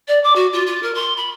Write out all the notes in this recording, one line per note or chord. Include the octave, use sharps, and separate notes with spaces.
D5
D6
F#4
F4
F4
A#4
C6
B5